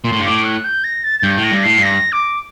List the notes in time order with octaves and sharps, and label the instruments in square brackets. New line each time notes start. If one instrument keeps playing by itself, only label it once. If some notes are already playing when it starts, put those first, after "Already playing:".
[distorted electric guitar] A#2 [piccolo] C6
[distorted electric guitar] A2
G2
[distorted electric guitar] A2 [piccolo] D6
[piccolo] F#6
G6
A#6
A6
A6
[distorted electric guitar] G2 [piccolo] G6
[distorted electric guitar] A2
[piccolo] A#6
[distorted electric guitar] G2
[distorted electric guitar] A2 [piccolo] C7
[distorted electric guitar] G2
[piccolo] A#6
D6